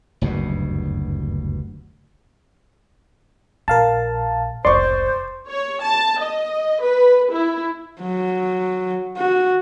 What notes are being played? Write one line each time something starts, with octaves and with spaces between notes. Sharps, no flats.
F#1 D2 G2 B2
A#1 A#4 F5 A5
F1 C#2 C5 D5 C6 C#6
C#5
A5
D#5
B4
E4
F#3
F#4